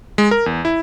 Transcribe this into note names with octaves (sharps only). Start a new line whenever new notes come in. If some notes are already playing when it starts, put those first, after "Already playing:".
G#3
A#4
E2
E4